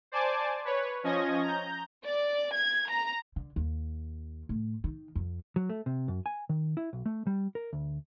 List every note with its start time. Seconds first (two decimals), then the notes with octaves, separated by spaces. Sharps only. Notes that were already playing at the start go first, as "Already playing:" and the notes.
0.12 C5 D5 G#5 A5 D6
0.65 B4 C#5
1.03 F3 C#4 D#5 G#6 A#6
1.43 A#5 G6
2.05 D5
2.55 G#6
2.90 A#5
3.36 D3
3.56 D#2
4.49 A2
4.84 D#3
5.15 F2
5.56 F#3
5.70 A3
5.86 C3
6.08 F#2
6.26 G#5
6.49 D#3
6.77 E4
6.93 B1
7.06 A3
7.27 G3
7.55 A#4
7.73 D2